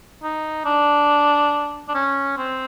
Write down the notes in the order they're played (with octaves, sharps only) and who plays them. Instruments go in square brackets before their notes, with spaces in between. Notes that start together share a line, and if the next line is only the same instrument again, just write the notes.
[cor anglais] D#4
D4
D4
C#4
C4